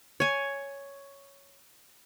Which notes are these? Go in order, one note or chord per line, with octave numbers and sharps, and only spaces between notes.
C#5 G#5